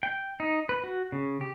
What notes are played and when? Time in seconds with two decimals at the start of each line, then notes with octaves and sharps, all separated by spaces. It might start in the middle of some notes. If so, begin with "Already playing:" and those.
0.03 G5
0.40 D#4
0.69 B4
0.84 F#4
1.12 C#3
1.41 G4